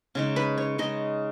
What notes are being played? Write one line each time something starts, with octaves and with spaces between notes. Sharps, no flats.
C#3 G#3 D#4
B4
C#5
C#3 G#3 D#4 D#5